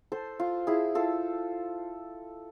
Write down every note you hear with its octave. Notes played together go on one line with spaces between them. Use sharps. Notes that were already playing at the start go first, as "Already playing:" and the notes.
A4 C5
F4
E4 G#4
F4 A4